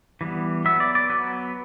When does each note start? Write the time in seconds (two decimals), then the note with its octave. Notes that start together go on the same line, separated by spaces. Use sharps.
0.21 E3 G3 B3
0.65 F#3 B3 E5
0.80 D5
0.95 D5
1.09 F#3 B3 B4